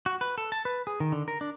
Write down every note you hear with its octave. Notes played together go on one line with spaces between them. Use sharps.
F#4
B4
A4
A5
B4
G#4
D#3
D3
A#4
D4